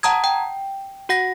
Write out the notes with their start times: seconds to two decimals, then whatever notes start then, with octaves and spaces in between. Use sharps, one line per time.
0.03 F#5 A5 A#5 D#6 G#6
0.24 G5
1.09 F#4 F#5 A#6